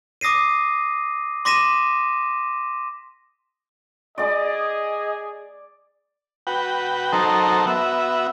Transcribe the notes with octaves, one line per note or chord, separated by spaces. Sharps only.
D6 D#6 A#6 C7 D#7
C6 D6 A#6 B6 D#7 E7
G#4 D5 D#5 D6
F#4 B4 G5
F#3 D#4 A4 A#4 C5
B3 F#4 E5